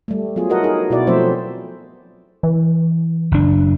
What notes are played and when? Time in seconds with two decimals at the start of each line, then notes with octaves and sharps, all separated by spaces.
0.08 G3 A3
0.36 F#3 B3 F4 G#4
0.50 E4 F#4 A4 A#4 D#5 F#5
0.63 D#4 G#4 A#4
0.90 B2 E4 F#4 D5
1.07 F3 F#3 A3 C4 C5 E5
2.43 E3
3.31 F#1 D4